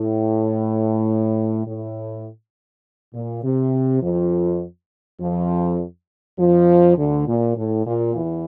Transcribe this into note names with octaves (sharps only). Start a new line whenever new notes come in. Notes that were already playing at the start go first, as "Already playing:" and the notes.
Already playing: A2
A2
A#2
C3
F2 F3
F2 F3
F2 F3
D2 D3
A#2
A2
A#2
E2 E3